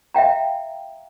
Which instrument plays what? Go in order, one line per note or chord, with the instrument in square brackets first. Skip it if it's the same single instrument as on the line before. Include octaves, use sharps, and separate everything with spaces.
[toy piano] E5 F5 G5 A#5